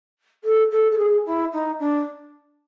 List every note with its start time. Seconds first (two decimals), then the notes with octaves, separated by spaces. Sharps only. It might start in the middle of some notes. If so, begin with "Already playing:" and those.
0.44 A4
0.71 A4
0.91 A4
0.98 G#4
1.25 E4
1.52 D#4
1.79 D4